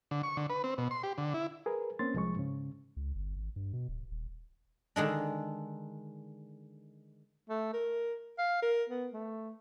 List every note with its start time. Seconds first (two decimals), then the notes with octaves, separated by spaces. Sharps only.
0.11 D3
0.23 C#6
0.37 D3
0.50 B4
0.64 C4
0.78 B2
0.91 C6
1.03 G4
1.18 D3
1.34 E4
1.66 G#4 A#4 B4
1.99 A#3 C4 C#4 C6 A6
2.14 C2 F3 G#3 C#6
2.36 G#2 C#3
2.97 C#2
3.15 G1
3.36 G#1
3.56 G2
3.73 B2
3.88 D1
4.11 D#1
4.96 D3 D#3 G#3 D4
7.49 A3
7.73 A#4
8.38 F5
8.62 A#4
8.89 B3
9.13 A3